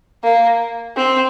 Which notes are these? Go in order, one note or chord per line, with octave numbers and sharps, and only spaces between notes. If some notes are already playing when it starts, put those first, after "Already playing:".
A#3
C4